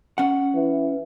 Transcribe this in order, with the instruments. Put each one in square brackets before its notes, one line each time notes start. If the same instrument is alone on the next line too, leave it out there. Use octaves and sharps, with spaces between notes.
[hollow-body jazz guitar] C#4 F#5
[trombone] E3